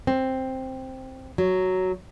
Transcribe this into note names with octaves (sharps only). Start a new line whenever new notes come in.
C4
F#3